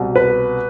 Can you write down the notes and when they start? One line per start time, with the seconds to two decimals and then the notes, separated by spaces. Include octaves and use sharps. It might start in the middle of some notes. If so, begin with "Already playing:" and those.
Already playing: C2 B2
0.16 B4